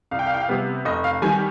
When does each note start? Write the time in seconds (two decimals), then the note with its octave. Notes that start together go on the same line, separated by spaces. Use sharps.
0.11 C2 F5
0.19 G5
0.27 F5
0.34 G5
0.41 F5
0.49 C3 G3 B3
0.85 F1 D#5
1.04 F5
1.22 D#3 G3 G#5